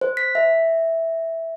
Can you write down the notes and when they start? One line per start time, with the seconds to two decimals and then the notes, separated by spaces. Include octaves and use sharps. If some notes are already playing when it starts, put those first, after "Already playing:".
0.01 C5
0.17 B6
0.35 E5